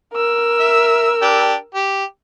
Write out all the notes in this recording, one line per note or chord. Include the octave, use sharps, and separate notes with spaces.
A#4 E6
E5
D4 G4 G5
G4